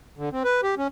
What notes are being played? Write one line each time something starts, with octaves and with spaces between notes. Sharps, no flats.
D3
C4
B4
G4
C#4